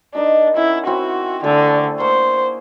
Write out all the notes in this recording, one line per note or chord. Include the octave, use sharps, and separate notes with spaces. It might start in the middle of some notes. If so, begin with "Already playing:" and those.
D4 D#4 A#4 D#5
C#4 E4 F#5
C4 E4 F#4
D3 A3 G#4
A#3 C5 C#6